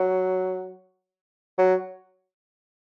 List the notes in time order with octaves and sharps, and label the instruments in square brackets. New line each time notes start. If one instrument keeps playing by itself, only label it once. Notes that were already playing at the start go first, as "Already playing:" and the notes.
Already playing: [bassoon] F#3
F#3